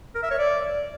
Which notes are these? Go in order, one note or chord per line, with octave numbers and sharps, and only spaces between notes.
A#4
E5
C#5
D5